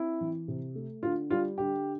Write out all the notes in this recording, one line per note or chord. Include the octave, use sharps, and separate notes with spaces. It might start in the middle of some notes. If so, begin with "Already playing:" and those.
Already playing: C4 E4
E3
C3
A3
D3 F4
G3 F4
D3 G4